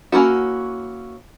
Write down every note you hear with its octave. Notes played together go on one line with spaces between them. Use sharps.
A#3 C#4 E4 F#4